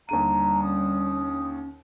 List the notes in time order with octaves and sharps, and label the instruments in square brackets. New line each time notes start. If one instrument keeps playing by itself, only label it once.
[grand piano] D#2 D3 D#7 [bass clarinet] G3 [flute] A#5
[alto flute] C#4 [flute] D#6